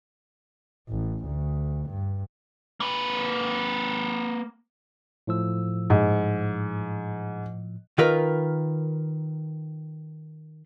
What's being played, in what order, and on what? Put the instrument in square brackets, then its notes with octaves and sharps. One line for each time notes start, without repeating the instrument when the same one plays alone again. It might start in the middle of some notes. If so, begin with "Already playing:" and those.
[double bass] A1
D2
G2
[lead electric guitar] A#3 B4
[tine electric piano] A2 F3 E6
[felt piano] G#2
[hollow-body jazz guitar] D#3 F4 A#4 B4